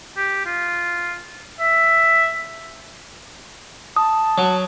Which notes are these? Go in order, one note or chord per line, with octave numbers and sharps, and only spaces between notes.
G4
F4
E5
A5 D#6
F#3